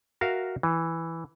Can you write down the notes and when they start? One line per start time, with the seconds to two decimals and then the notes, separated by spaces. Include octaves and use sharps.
0.21 F#4 A#4 E5 F5
0.63 E3